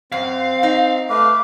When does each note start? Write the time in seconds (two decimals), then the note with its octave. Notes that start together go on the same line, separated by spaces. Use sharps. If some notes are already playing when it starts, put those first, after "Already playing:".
0.12 F#2 C4 F5
0.63 D#4
1.10 A3 B4 F5 D6